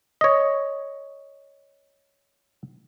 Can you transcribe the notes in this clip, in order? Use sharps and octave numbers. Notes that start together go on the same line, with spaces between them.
C#5 D#5